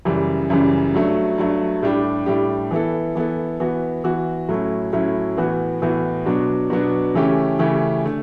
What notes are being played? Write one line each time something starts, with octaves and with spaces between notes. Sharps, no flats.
F#2 C#3 E3 G3
F#2 C#3 E3 G3
G2 F#3 A3
G2 F#3 A3
A2 G3 D4 G4
A2 G3 D4 G4
E3 B3 E4 A4
E3 B3 E4 A4
E3 B3 F#4
E3 B3 F#4
A2 F#3 A3 C#4 E4
A2 F#3 A3 C#4 E4
A2 E3 B3 F#4
A2 E3 B3 F#4
B2 F#3 B3 D4
B2 F#3 B3 D4
C#3 E3 A3 C#4 G4
C#3 E3 A3 C#4 G4
D3 A3